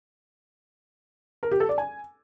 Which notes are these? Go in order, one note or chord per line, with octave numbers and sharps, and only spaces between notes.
A#4
G4
A4
D5
G#5